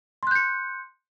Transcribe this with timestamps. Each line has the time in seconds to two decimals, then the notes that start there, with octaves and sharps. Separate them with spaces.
0.23 C6
0.27 F#6
0.31 G6
0.35 C#7